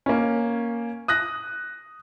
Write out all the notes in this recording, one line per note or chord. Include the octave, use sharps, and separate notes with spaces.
A#3 C#4
D#6 F#6 A#6